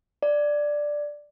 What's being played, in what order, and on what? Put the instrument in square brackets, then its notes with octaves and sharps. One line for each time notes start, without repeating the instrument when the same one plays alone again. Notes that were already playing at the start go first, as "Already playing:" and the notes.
[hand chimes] D5